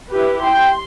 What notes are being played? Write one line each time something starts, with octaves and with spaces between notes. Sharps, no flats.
E4 G4 B4
G5 C6